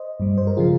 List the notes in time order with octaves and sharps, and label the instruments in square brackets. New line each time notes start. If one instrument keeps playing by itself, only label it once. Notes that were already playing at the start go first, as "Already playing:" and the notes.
Already playing: [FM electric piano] C5 D#5
G2 G3
C5
A#4
C#3 F3 F4 G#4